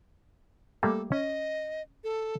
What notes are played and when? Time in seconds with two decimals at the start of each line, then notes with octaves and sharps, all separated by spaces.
0.83 G3 A3 A#3 A4
1.12 C#4 D#5
2.04 A4